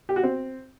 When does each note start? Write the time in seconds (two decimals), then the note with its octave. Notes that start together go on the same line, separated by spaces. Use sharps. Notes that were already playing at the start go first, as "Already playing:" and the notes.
0.09 G4
0.16 F#4
0.23 C4